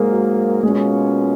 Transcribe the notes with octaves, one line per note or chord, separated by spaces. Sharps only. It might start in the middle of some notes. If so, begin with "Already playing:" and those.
Already playing: G#2 F#3 G#3 A#3 G#4 A#4
F#4
B2 G#3 A#3 C#4 F4 G#4